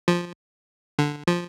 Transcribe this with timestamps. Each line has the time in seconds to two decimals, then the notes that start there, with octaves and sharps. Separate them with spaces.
0.08 F3
0.99 D3
1.27 F3